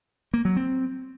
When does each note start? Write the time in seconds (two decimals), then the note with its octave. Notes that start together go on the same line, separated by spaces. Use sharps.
0.34 A#3
0.45 F#3
0.56 C4